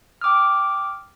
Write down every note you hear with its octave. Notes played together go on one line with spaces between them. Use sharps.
G5 D6 D#6 F6